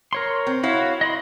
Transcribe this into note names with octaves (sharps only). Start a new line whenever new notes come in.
A#4 C#5 C6
C4
E4 F#4 C#5 F5
D#5 B5 C6